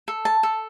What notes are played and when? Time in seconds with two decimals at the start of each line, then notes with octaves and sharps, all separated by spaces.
0.08 A4
0.25 A5
0.43 A4